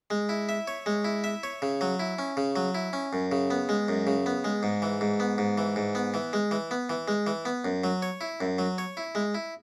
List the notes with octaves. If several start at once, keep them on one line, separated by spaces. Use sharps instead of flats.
G#3
E4
E5
C#5
G#3
E4
E5
C#5
C#3
F#3
E4
C#4
C#3
F#3
E4
C#4
F#2
C#3
B3
G#3
F#2
C#3
B3
G#3
G#2
E3
G#2
B3
G#2
E3
G#2
B3
E3
G#3
E3
B3
E3
G#3
E3
B3
F#2
F#3
C#5
E4
F#2
F#3
C#5
E4
G#3
E4